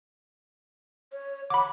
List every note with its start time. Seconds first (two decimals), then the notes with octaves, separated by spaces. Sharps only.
1.12 C#5
1.50 F#5 B5 D6